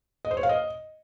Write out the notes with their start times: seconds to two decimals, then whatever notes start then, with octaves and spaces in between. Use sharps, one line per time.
0.25 D#5
0.31 C5
0.37 C#5
0.43 F5
0.49 D#5